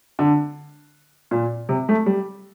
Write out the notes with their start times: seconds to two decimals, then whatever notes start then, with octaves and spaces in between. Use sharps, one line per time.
0.19 D3
1.31 A#2
1.69 C3
1.89 A3
2.06 G3